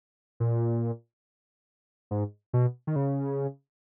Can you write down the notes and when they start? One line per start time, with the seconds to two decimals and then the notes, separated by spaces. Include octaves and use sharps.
0.40 A#2
2.11 G#2
2.53 B2
2.87 D#3
2.96 C#3